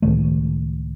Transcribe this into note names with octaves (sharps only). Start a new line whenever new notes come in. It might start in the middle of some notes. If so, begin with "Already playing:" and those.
C#2 A2 D#3 A3